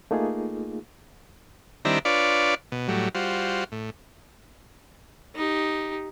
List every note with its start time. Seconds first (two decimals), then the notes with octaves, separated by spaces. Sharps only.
0.11 A3 A#3 D#4 F4 G#4
1.85 D#3 G3 C4 D4 E4 A#5
2.05 D4 F4 B4 C#5 D5
2.72 B2
2.88 A2 F#3 G3
3.15 G3 F4 F#4 C5
3.72 A2
5.36 D#4 G4